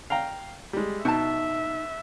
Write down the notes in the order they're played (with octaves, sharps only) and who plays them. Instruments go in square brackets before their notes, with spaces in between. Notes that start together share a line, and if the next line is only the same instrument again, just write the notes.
[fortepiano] F5 G5 A#5
G3 G#3
[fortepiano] B2 [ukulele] D#4 A5 [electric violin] E5